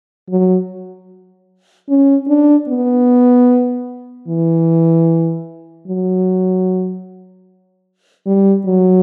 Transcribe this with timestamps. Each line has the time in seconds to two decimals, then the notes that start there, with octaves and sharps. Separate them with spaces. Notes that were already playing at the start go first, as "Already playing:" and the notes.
0.30 F#3
1.89 C#4
2.28 D4
2.69 B3
4.28 E3
5.88 F#3
8.27 G3
8.66 F#3